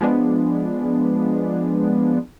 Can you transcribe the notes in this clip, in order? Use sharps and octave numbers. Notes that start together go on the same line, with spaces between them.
F3 G#3 B3 D4